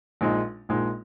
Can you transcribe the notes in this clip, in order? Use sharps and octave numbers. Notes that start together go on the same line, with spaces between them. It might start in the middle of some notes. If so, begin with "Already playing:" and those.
A#1 A#2 G#3 D#4
A#1 A#2 G#3 D#4